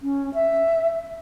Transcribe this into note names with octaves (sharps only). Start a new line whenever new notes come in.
C#4
E5